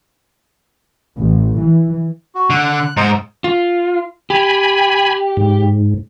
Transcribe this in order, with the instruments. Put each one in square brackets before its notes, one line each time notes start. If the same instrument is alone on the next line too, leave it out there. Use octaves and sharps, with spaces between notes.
[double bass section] A1
E3
[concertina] F#4
[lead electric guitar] D3 [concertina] F#6
[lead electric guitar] G#2 [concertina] C5 D#5 A#5
[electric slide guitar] F4
[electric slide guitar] G4 [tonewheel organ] G#5 B5
[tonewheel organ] G#2